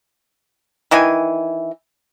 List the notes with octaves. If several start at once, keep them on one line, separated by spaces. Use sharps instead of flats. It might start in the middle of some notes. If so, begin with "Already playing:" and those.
D#3 E3 D#5 G#5